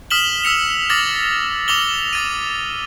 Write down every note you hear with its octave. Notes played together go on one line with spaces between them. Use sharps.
D#6 F6 B6 E7 F#7 G7
E6 B6 C#7 F7
D6 D#6 F6 A6 A#6 F#7
D6 E6 F7 G7
D#6 A6 D#7